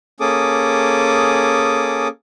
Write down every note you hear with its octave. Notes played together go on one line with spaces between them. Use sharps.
A#3 C#4 G#4 A4 D6 D#6